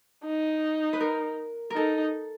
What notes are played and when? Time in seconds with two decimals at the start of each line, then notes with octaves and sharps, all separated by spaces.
0.25 D#4
0.93 B4
1.00 A#4
1.70 A#4
1.75 D#4 A4